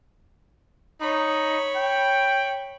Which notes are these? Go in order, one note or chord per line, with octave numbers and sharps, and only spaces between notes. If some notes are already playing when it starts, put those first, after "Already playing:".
D#4 C#5 B5
G5